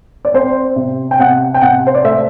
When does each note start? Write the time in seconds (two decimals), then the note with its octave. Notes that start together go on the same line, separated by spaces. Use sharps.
0.25 D5
0.34 C4 C5
0.76 C3
1.11 G5
1.19 C3 F#5
1.54 G5
1.61 C3 F#5
1.87 C5
1.95 D5
2.04 A3 E5